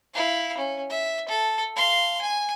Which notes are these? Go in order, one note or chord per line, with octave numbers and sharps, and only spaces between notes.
E4 F5
C#4
E5
A4
F5 C6
G#5